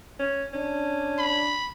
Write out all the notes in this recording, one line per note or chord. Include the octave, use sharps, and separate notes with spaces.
C#4
C#4 D4
B5